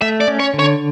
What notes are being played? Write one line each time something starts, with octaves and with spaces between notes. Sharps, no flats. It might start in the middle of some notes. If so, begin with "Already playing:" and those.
A3 E5
D5
C#4
C#5
D3
C#5